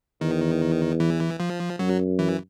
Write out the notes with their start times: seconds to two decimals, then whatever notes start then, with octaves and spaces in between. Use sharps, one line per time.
0.21 E2 D#3
1.00 E3
1.40 F3
1.79 F#2 F#3
2.19 E3